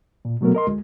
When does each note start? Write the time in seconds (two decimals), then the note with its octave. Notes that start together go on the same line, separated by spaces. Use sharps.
0.25 A#2
0.41 B2 F#3 A3 B3 A#4
0.55 A#4 D#5 C6
0.67 D2 G#3